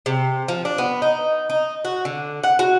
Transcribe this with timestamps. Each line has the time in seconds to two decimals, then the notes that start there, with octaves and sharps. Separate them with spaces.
0.06 C3
0.48 F3
0.65 D4
0.78 B3
1.02 D#4
1.50 D#4
1.85 F#4
2.05 D3
2.43 F#5
2.59 F#4